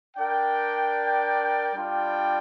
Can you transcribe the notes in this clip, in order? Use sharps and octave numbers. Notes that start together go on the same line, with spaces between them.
D4 A#4 D5 G5
G3 D4 F4 D5 G5